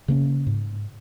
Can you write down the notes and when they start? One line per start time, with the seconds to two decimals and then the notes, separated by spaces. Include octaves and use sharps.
0.08 C#3 A#3 C#4
0.47 G#2